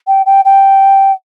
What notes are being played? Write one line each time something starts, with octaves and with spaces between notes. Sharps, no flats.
G5
G5
G5